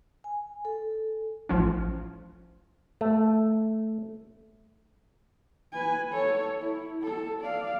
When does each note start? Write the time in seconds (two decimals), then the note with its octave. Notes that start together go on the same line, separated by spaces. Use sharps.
0.24 G#5
0.65 A4
1.49 A1 F3 C#4
3.01 A3
5.72 B4 G#5
6.12 A4 C#5
6.60 E4
7.03 A4
7.41 D5 F5